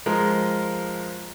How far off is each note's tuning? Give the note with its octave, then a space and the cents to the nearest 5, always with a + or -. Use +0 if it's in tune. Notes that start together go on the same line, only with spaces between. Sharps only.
F3 +0 G#3 +0 A#4 +0